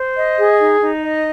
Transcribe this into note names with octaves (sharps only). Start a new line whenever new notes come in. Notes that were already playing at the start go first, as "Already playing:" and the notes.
Already playing: C5
D#5
G#4
D#4
D#4
D#5